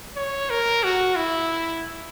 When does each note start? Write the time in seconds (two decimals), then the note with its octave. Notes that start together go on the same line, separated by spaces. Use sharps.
0.16 C#5
0.50 A#4
0.84 F#4
1.16 E4